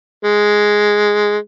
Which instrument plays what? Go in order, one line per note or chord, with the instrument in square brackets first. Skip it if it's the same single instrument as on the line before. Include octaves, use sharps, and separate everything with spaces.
[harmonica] G#3